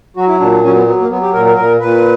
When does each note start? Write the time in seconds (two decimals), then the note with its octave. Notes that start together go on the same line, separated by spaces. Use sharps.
0.17 F#3 F#4
0.28 E4
0.40 A#2 D4
0.51 D4
0.64 F#3 C#4
0.75 B3
0.86 F#3 B3
0.99 A#3
1.10 F#3 B3
1.22 G4
1.33 A#2 A#4
1.45 A#4
1.56 A#2 A#4
1.80 A#2 B4